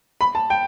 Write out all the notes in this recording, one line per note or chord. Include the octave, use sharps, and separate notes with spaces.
B5
A5
G5